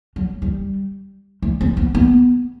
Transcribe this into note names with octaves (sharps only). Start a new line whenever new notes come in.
F#3
G3
A3
C4
B3
B3